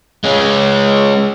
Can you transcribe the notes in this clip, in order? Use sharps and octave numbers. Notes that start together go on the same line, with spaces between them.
G#3 C#4